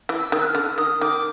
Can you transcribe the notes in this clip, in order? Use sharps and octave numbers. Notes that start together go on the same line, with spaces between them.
E3
E6
D#3
F#6
F6
D3
D#3 D#6
D#3 D6